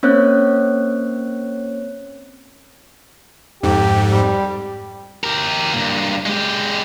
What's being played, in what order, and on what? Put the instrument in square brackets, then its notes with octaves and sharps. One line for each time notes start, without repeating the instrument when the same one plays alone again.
[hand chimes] A#3 C4 C#4 C#5 F#6
[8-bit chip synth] F2 G#2 [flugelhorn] G4
[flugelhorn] G3
[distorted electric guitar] G4 A#4
G2 A#3
G#3 G4